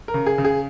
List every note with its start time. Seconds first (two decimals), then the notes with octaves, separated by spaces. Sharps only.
0.08 A#4
0.14 C#3
0.26 G#4
0.38 C#3
0.45 G#4